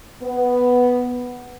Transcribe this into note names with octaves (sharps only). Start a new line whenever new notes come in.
B3